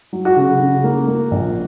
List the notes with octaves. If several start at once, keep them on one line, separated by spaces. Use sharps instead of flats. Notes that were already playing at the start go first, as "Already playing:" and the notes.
F#3
F#4
C#3
C#3
A#3
A#3
A#1